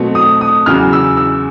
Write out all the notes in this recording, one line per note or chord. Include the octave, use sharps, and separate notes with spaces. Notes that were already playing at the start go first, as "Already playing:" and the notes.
Already playing: B2 F#3 A3 C4
D#6
D#6
E2 C#3 F#3 F6
E6
E6